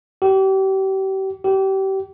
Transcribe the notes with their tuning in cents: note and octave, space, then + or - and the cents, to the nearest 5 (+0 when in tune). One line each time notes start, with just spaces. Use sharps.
G4 -35
G4 -30